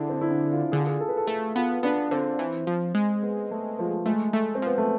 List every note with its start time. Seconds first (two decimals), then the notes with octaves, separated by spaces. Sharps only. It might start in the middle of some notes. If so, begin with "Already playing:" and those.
Already playing: D3 D4 E4 G#4
0.09 C4
0.21 E4
0.31 D4
0.52 F4
0.72 D3 G#4
0.80 F4
0.87 G#4
1.00 A4
1.09 B4
1.17 A4
1.27 A3 A4
1.56 B3 F4
1.83 B3 D4
2.11 D3 C4
2.39 E3
2.67 F3
2.95 G#3
3.23 B3
3.51 A3
3.79 F3
4.06 G#3 A3
4.33 A3
4.55 C4
4.62 F3 B3
4.78 A3